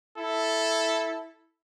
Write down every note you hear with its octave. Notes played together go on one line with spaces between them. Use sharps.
E4 A4